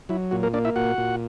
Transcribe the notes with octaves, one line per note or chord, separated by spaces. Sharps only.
F#3 E4
A#2 F#4
A#3 A#4
A#3 D4 D5
E4 E5
A#2 F#4 F#5
A#2